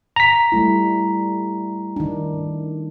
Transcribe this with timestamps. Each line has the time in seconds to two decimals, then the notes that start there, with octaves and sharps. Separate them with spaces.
0.16 A#5 B6
0.52 G3 A3 E4
1.96 D#3 D4